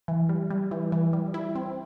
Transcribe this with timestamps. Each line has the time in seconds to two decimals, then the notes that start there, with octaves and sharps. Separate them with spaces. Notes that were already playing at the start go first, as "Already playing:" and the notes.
0.08 E3
0.29 G3
0.50 G3
0.71 E3
0.92 E3
1.13 G3
1.34 E4
1.55 C4